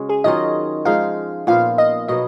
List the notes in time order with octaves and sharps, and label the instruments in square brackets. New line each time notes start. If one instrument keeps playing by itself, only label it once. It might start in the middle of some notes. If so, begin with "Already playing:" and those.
Already playing: [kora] C#3 G#3 C#4 F#4
[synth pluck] G#4
[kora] D#3 F#3 C#4 F4 [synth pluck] D#5
[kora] F3 G#3 D#4 [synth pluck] F5
[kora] A#2 F3 B3 [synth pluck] F5
[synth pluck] D#5
[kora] B2 F#3 B3 [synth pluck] D#5